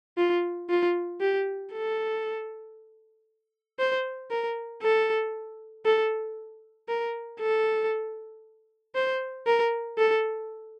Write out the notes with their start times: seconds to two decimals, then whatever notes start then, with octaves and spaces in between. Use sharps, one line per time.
0.17 F4
0.70 F4
1.21 G4
1.73 A4
3.79 C5
4.31 A#4
4.82 A4
5.85 A4
6.88 A#4
7.40 A4
8.95 C5
9.46 A#4
9.98 A4